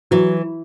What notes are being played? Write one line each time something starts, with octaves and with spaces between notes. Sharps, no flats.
E3 F#3